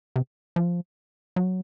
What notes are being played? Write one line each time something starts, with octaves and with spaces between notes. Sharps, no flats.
C3
F3
F#3